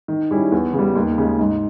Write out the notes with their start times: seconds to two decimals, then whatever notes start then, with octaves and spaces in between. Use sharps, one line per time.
0.08 D#3
0.31 G3 C#4 E4 G#4
0.52 E2
0.74 C#3
0.79 G3
0.95 D#2
1.18 C#3 G#3
1.39 G#2